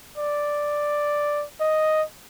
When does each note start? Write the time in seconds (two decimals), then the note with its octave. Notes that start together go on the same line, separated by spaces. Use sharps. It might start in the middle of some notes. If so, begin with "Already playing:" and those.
0.18 D5
1.60 D#5